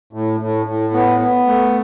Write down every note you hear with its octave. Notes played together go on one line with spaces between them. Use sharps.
A2
A2
A2
B3
B3
A3